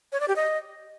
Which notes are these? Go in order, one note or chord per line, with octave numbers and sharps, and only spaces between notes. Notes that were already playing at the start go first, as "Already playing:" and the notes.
C#5
D5
G4
D#5